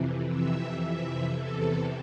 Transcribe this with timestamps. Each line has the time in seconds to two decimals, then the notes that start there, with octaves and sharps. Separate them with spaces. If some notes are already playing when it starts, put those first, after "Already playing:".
Already playing: F2 C3 E3
0.27 E5
0.79 E5
1.32 E2 C3 E3 A4